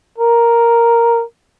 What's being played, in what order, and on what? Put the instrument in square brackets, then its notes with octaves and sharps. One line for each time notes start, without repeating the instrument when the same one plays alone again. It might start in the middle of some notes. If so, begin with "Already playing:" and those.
[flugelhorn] A#4